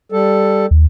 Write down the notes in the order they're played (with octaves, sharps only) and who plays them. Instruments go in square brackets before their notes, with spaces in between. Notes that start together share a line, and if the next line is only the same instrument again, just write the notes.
[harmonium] G3 A4
[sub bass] D#2